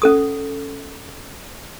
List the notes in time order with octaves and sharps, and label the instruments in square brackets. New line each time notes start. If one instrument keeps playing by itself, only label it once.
[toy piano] C#4 A4 D#6